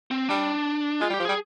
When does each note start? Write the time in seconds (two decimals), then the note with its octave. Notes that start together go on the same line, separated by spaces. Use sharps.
0.11 C4
0.29 G3 D4
1.01 G#3 F4
1.10 G3
1.14 G4
1.20 F3
1.25 G3 G#4